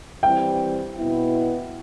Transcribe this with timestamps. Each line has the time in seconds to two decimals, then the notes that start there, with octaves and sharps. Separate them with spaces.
0.23 E3 G3 C4 E4 G5
0.97 B2 B3 E4